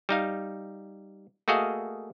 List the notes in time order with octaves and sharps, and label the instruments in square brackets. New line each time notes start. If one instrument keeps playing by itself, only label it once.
[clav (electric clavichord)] G3 D#4 F5
A3 A#3 F#4 G#4 D#5 F5